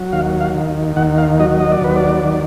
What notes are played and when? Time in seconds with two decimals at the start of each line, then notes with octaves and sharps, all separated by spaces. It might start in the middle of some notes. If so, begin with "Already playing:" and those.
Already playing: F#3
0.12 D#2 F5
0.41 F5
0.54 D#3
0.96 D#2 F#5
1.18 F5
1.40 F#3 D#5
1.60 D#5
1.72 D5
1.81 D#2 B4
1.96 D5
2.24 D#3